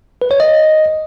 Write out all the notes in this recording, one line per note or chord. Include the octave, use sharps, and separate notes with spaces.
B4
C#5
D#5